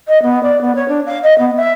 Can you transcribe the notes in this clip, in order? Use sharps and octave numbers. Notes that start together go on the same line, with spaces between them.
D#5
B3
D5
B3
C#5
D4
F5
D#5
B3
E5